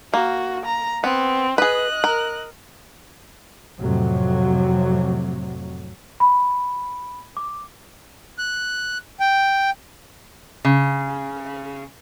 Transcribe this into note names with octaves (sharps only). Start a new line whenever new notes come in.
A#3 F#4
A#5
B3 C4
G#4 B4 D#5 F#6
A#4
F2 A2 C3 F#3
B5
D6
F#6
G5
C#3